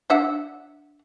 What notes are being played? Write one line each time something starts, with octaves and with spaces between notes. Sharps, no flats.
D4 E5 F#5